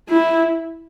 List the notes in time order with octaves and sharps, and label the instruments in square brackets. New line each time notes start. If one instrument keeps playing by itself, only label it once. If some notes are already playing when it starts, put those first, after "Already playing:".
[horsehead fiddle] E4